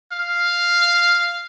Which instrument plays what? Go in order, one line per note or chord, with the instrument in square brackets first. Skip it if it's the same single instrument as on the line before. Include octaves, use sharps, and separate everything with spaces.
[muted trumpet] F5